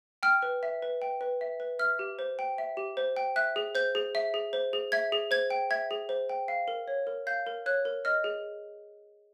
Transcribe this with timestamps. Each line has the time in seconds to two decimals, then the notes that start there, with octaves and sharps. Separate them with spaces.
0.23 G5 F6
0.43 B4
0.63 E5
0.82 B4
1.02 G5
1.21 B4
1.41 E5
1.60 B4
1.79 E5 F6
1.99 G4
2.19 C5
2.39 G5
2.58 E5
2.77 G4
2.97 C5
3.16 G5
3.36 E5 F#6
3.56 G#4
3.75 C5 G6
3.95 G#4
4.15 E5
4.34 G#4
4.53 C5
4.73 G#4
4.92 E5 G#6
5.12 G#4
5.31 C5 G#6
5.50 G5
5.70 E5 G#6
5.91 G#4
6.09 C5
6.29 G5
6.48 F5
6.68 A#4
6.88 C#5
7.07 A#4
7.27 F5 G6
7.46 A#4
7.66 C#5 F#6
7.85 A#4
8.05 D#5 F6
8.24 G#4